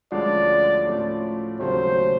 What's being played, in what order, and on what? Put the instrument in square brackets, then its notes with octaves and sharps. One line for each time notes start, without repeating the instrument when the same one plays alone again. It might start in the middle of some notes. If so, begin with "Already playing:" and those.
[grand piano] D2 D3 F3 G#3 C#4 [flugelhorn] D5
[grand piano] A2 F3 A3 C#4
[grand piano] D#2 C#3 F#3 A3 C#4 [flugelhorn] C5